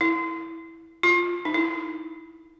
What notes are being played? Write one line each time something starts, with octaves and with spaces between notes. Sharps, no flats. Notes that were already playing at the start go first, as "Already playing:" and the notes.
E4
F4
D#4
E4